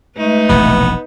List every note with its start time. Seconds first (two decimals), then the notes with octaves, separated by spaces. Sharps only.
0.17 G#3 A3 D#4 B4
0.49 E1 A#1 C3 B3